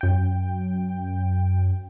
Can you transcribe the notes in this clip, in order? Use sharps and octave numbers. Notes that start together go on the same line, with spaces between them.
F#2 G5